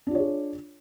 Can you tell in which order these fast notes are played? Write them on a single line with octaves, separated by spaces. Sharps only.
D4 F4 C#5 G#4